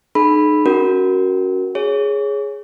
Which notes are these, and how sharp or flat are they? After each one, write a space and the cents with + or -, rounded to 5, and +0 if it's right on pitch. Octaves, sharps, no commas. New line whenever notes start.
D#4 -35 G#4 +45 B5 +0
C#4 +10 F#4 +10 A#4 +0
G#4 +0 C#5 +0